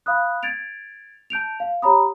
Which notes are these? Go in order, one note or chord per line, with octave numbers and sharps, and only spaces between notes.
F5 B5 D#6 F#6
G#6 A6 D7 F7
A5 G6 D7 F7
F5
G4 C#5 A#5 B5 D#6